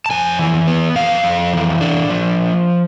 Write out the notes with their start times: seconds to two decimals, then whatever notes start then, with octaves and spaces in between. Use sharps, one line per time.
0.06 A5
0.11 F2 G#5
0.39 E3
0.67 B3
0.95 F2 F5
1.24 F2
1.53 E3
1.81 D4
2.10 F3